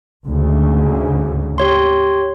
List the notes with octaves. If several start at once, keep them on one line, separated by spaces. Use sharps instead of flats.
D2 G#2 C#3
G4 C#5 C6